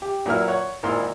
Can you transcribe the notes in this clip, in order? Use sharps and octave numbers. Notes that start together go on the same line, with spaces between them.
G4
A#2 F#3 E4 A#4 E5 F6
C#5 F#5
G#1 A#2 E4 A#4 C6